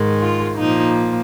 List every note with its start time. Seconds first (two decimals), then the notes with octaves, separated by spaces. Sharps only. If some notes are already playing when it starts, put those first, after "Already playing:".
Already playing: G#2 D#3 G#3
0.21 F4
0.58 A#2 F3 A#3 D#4